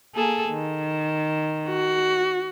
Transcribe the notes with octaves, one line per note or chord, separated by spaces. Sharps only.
A#3 G#4 A4
D#3
F#4